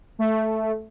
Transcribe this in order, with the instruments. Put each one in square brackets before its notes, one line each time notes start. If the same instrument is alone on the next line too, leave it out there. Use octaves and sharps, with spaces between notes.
[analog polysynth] A3